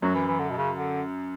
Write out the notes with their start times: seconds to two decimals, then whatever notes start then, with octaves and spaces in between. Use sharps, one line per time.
0.02 F#2 F#3
0.14 E3
0.27 E3
0.39 D3
0.50 B2
0.58 C#3
0.76 D3